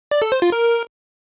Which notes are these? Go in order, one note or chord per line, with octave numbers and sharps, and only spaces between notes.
D5
A4
C5
F4
A#4